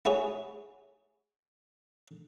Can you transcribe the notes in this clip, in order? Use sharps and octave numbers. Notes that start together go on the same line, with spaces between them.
E4 F#4 G#4 C#5